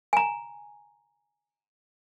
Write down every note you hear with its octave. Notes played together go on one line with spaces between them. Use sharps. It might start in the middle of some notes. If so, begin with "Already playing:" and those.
G#5 A#5